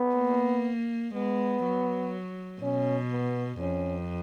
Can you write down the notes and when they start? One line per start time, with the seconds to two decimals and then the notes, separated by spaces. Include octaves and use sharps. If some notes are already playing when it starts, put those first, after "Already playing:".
Already playing: B3
0.16 A#3
1.15 G#3 B3
1.64 F#3
2.62 B2 C#4
3.11 B3
3.60 F2 C#4